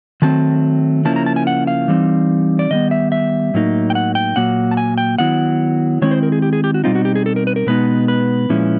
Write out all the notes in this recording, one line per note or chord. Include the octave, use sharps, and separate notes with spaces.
D#3 F#3 A3 C4 A5
C#3 F3 A#3 C#4 E4 A5
A#5
A5
G#5
F#5
F5
E3 G3 C4 D#4
D5
D#3 G3 B3 D#5
E5
E5
A2 F#3 A#3 D#4
G5
F#5
G5
A#2 F#3 A#3 F#5
A5
G#5
G5
D#3 F#3 B3 E4 F#5
D#3 G#3 C4 E4 C#5
C5
A#4
G#4
G4
G#4
G4
F#4
B2 G3 C4 D#4 F4
F#4
G4
G#4
A4
A#4
B4
A#4
B2 G#3 B3 D#4 B4
B4
A#2 F3 G#3 C#4 E4